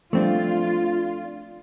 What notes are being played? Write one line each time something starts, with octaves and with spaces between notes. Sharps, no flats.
F3 G3 A3 C4 D4 F4